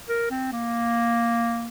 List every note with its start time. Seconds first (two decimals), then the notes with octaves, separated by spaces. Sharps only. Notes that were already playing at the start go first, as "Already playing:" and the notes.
0.09 A#4
0.31 C4
0.53 A#3